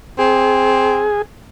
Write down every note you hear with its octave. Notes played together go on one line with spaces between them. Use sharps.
C4 G#4